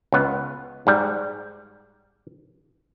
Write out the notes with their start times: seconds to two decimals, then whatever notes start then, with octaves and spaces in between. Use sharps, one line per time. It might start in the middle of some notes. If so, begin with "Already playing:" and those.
0.12 C#2 B3
0.87 G#2 G3